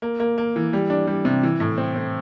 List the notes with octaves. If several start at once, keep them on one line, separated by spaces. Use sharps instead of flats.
A#3
A#3
A#3
E3
G3
D4
G3
C3
E3
A2
C4
C4